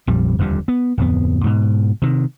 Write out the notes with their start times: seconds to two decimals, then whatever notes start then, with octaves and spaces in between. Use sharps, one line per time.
0.07 A#1 F2 G3
0.39 D#1 F2 D3 G3
0.68 B3
0.98 D1 F2 B3
1.44 G#2 B2
2.02 C3 D#3